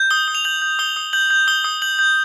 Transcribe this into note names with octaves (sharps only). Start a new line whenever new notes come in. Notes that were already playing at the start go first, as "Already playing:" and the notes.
Already playing: G6
D#6 G7
D#6
F7
G6 F#7
G6
D#6 G7
D#6
G6 F#7
G6
D#6 G7
D#6
G6 F#7
G6